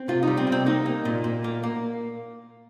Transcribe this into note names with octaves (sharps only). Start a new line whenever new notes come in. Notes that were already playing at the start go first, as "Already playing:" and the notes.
Already playing: C4
C3 F4
G3 D#4
C4
C3
C4
A#3 D#4
A#3
A#2
A#2
A#3
A#3